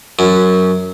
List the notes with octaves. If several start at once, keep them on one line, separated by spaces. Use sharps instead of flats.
F#2